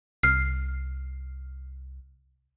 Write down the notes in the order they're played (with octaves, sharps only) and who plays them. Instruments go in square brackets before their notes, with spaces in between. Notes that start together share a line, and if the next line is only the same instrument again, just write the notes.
[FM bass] C2 [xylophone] F6 C7